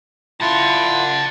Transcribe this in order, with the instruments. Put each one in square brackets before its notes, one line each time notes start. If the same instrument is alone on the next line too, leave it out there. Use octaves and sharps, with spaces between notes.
[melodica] E4 F4 [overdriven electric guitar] F#5 A5